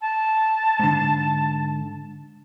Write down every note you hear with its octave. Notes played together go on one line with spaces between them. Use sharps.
A5
G#2 D3